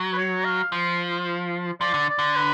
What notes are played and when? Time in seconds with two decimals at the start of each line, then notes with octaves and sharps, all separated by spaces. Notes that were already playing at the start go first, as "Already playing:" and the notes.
Already playing: F#3
0.13 B4
0.17 C#5
0.45 F5
0.72 F3
1.81 F3 D5
1.94 D3
2.09 D5
2.19 D3
2.36 B4